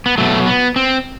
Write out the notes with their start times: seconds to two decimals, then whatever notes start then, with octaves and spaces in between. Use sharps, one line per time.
0.06 B3
0.18 B2 F#3 A3
0.46 B3
0.76 C4